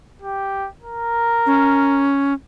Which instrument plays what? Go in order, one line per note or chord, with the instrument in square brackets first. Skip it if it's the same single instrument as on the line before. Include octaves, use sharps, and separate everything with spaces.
[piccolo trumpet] G4
A#4
[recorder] C#4